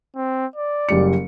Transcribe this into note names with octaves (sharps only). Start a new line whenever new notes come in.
C4
D5
F#1 G3 C#7